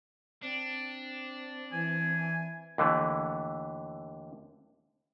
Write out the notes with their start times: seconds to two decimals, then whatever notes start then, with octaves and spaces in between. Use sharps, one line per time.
0.43 C4 D4
1.73 E3 G#5
2.78 D#2 D3 E3 A3